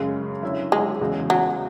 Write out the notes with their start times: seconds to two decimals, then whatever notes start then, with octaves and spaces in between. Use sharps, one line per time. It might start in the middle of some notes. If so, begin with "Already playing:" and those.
Already playing: F#2 C#3 G#3
0.43 D3 F#3 C#4 E4
0.72 G#3
1.01 E2 C#3 G#3 C#4 F#4
1.30 F#3